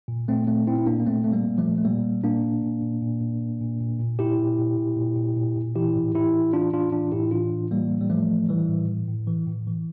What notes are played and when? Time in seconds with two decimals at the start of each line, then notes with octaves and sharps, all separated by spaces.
0.08 A#2
0.28 A#2 A3 C4
0.47 A#2 A3 C4
0.67 A#2 C4 E4
0.78 E4
0.86 A#2 A#3 D4
1.00 A#3
1.07 A#2 A3 C4
1.24 A#2 A3
1.32 G3 A#3
1.46 A#2
1.58 F3 A3
1.65 A#2
1.78 A3
1.85 A#2 G3 A#3
2.04 A#2
2.23 A#2 A#3 D4
2.43 A#2
2.62 A#2
2.82 A#2
3.02 A#2
3.21 A#2
3.41 A#2
3.61 A#2
3.81 A#2
3.99 A#2
4.19 A#2 E4 G4
4.39 A#2
4.59 A#2
4.77 A#2
4.97 A#2
5.17 A#2
5.37 A#2
5.56 A#2
5.75 E3 E4 G4
5.96 A2
6.14 E3 E4 G4
6.34 A2
6.53 E3 D4 F4
6.73 A2 D4 F4
6.92 E3 D4 F4
7.12 A2 E4 G4
7.31 E3 D4 F4
7.51 A2
7.71 E3 G3 A#3
7.91 A2
8.01 G3
8.10 E3 F3 A3
8.29 A2
8.49 E3 G3
8.68 A2
8.89 E3
9.08 A2
9.27 E3
9.47 A2
9.67 E3